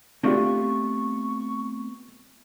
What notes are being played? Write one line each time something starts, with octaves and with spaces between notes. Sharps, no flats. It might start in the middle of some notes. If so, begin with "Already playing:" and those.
A3 B3 C4 D4 F4 G4 C#6